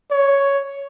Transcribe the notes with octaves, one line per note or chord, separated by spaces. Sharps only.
C#5